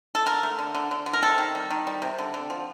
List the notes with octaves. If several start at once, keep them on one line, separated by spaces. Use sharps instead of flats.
A4
D3 A#4
A3
D3
D3
D3
D3
A#4
C3 A4
D#3
G3
D#3
G3
C3
D3
D3
F3